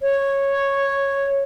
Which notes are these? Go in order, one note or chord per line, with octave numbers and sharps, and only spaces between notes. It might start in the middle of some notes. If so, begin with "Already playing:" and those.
C#5